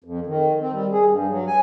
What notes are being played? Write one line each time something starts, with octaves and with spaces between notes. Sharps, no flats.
F2
D#3
C4
G3
G#4
G2
F#3
G#5